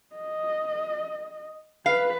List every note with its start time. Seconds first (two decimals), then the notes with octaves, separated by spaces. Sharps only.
0.16 D#5
1.86 B4 F5